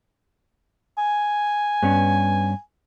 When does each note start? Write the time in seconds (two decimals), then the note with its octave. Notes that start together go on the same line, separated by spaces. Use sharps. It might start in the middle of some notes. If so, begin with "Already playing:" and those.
0.98 G#5
1.82 G2 B3 C#4